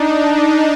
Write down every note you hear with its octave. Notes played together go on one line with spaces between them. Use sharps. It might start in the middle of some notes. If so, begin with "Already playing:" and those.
Already playing: D4 D#4